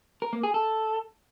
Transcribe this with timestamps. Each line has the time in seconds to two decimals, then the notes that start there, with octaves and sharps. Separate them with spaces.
0.22 A#4
0.33 A#3
0.43 G#4
0.54 A4